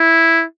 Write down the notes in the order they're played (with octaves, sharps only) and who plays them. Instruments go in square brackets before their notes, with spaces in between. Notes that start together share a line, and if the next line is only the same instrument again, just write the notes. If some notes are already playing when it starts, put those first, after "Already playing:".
Already playing: [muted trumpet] E4